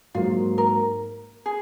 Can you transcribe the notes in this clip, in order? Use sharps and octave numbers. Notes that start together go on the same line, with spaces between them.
G#2 F#3 A#3 F4 F5
A#4
G#4